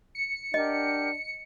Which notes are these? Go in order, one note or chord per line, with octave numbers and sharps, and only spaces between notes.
C#7
D4 G4 A#4 D#5 F#5